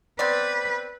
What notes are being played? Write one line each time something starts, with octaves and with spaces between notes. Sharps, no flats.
B3 C4 B4 D5